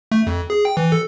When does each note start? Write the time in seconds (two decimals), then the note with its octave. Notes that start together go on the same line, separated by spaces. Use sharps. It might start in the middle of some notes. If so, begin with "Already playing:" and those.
0.12 A3
0.27 F2
0.50 G#4
0.65 G5
0.77 E3
0.92 A4